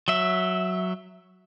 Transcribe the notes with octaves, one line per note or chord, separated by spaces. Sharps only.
F#3 E5